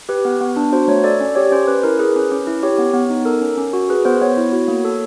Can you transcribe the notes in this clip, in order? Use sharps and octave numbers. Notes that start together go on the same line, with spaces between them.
G4 B4
B3
B3
D4
F#4 C5
A3 C#5
A4 D5
C#4 D5
G4 C#5
C#4 C5
C#4 B4
E4 A#4
G#4 B4
C#4
C#4
E4
G4 C#5
B3
B3
D#4
A4 A#4
C#4
C#4
F#4
G#4 B4
B3 C5
B3 C#5
E4
F#4
A#3
A4